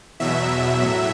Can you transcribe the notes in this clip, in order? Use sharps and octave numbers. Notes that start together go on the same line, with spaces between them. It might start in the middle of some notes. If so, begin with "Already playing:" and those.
E2 B2 F#3 E5
A2 F#3